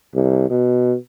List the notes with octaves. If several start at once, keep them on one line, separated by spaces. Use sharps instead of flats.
C2
B2